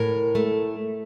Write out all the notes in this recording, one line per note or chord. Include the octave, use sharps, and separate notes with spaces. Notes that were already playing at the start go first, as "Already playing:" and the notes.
Already playing: A2 A#4
A3